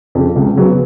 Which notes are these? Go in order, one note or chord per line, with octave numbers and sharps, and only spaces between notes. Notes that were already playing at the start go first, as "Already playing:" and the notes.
F2 C#3
C#2
C#3 F#3 B3